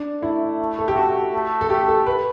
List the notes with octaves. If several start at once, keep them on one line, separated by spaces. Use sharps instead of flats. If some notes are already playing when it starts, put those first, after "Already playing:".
Already playing: D4
A3 E4
A4
G4
F#4
A3
A4
A3 G4
A4
B4